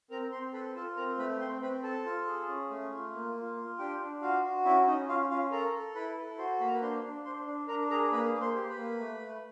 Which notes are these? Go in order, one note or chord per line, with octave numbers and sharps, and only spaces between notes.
C4 A#4 A#5
C4 C5 C6
A4 B4 B5
F4 A4 A5
C4 A#4 A#5
A3 B4 B5
C4 C5 C6
C4 B4 B5
A4 A5
F4
G#4
C#4
A3
F4
A#3
F4
F4
D4 G4 G5
D4
F4 F#4 F5
F#4
C#4 E4 E5
C#4 D#4 D#5
C#4 F4 F5
C#4 F4 F5
A4 A#4 A#5
A4
E4 B4 B5
A4
F#4 C5 C6
A#3 B5
A#5
B4 B5
D4 C5 C6
D4
D4 C5 C6
D4
D4 A#4 A#5
G#4 A#4 A#5
A#3 B4 B5
A#3
C5 C6
G4
B4 B5
A#3
A3
A3